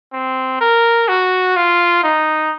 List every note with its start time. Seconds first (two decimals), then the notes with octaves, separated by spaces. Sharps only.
0.13 C4
0.61 A#4
1.09 F#4
1.57 F4
2.03 D#4